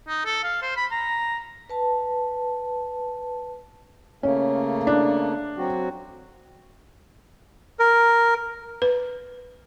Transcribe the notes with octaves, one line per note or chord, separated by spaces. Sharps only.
D#4
A4
F5
C5
B5
A#5
B4 A5
C#3 A3 A#3 C#4
D4
F#3 C4 F#4
A#4
B4